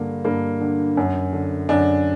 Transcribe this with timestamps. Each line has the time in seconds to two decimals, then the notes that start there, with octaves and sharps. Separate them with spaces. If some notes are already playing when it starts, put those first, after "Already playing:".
Already playing: G2 D3 A#3
0.25 G2 A#3
0.61 D3
0.97 F#2
1.33 D3
1.69 F#2 D4